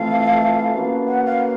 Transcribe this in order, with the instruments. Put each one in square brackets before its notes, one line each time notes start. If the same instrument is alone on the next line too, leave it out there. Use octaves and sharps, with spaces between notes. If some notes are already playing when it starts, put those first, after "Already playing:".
Already playing: [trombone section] E3 A3 C4 F4 A4 [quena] F5
[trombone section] A#3 C#4 F#4 B4
[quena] F#5
F5